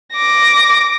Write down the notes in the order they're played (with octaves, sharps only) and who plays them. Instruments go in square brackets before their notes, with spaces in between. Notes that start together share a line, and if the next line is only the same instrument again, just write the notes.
[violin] D6 A#6